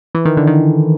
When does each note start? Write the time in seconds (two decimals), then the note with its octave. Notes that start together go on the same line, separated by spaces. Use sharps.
0.15 E3
0.25 D#3
0.37 D3
0.47 D#3